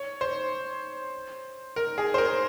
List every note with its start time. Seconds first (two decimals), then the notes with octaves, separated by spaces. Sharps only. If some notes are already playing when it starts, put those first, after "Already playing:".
Already playing: C#5
0.21 C5
1.76 A#4
1.98 G#4
2.14 C5
2.18 A#4